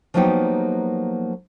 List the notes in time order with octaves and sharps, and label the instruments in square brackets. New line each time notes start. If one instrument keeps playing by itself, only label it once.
[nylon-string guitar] F3 F#3 A#3 B3 D#4 G4